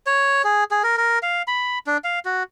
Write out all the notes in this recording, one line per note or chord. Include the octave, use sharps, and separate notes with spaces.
C#5
G#4
G#4
A#4
A#4
F5
B5
D4
F5
F#4